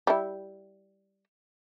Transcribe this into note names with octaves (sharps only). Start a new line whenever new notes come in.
G3 E4